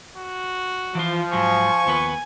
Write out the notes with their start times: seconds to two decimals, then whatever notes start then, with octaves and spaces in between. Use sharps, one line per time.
0.17 F#4
0.95 E3 F3 F4
1.33 G#2 F#3 G#5 C#6
1.86 D#2 B3 B4